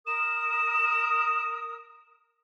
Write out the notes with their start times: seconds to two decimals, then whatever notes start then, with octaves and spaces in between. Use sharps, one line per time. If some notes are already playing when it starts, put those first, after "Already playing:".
0.07 A#4 D#6 E7